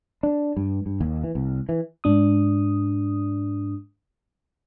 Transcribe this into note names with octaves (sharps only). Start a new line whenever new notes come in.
D4
G2
G2
D#2
E3
C2
E3
G#2 D4 D#6